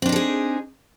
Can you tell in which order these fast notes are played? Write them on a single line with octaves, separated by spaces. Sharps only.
C4 D4 D#4 A4 G#4